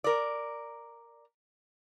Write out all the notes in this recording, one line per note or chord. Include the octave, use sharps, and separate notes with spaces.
A#4 D5